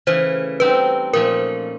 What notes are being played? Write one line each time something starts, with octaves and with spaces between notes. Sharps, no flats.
C#3 E3 A3 C5
G3 C4 D#4 F#4 B4
A#2 F3 A3 C#4 A#4